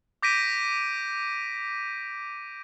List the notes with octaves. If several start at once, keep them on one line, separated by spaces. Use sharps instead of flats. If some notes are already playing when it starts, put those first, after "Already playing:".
D6 G6 A#6 B6 D7 D#7